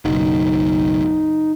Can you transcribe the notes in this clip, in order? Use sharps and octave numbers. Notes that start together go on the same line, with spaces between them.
F#1 B1 D#4